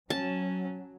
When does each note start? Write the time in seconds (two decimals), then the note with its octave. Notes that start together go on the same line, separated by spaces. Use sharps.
0.10 F#3 C#4 A5